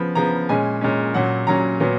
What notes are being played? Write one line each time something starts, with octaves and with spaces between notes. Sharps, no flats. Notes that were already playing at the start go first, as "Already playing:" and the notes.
Already playing: C#3 F3 B3 B5
C#3 F3 B3 A#5
A#2 G#3 C#4 G#5
A#2 G#3 C#4
A#2 F#3 C#4 F#5
A#2 F#3 C#4 A#5
A#2 F#3 B3